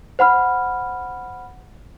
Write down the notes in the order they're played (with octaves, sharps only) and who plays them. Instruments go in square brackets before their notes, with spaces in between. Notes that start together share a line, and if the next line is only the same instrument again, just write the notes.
[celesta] C5 F#5 B5 F6